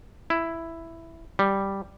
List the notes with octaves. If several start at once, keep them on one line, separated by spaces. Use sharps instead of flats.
E4
G3